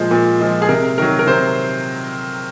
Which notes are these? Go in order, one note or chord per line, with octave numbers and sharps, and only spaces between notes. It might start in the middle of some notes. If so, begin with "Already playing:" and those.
Already playing: A#2 F3 G#3 C5
A#2
F3 G#3
G#4
C3 A#4
D#3 F#3 A#4
A#4
C3 C5